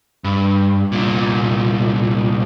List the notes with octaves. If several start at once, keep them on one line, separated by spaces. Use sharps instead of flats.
G2
C2 A#2